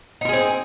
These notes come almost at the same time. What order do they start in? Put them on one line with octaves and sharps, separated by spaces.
D#4 A#4 G#4 C4